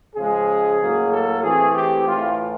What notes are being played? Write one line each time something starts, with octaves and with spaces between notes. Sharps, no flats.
C#3 F3 G#3 G#4
A2 F#3 A#3
A4
E3 A3 C4 G#4
G4
A2 E3 A3 F4